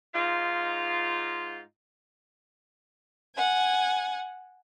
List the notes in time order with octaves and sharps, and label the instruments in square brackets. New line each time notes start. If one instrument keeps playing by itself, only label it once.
[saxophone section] G#2 D#4 F4
[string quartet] F#5 G#5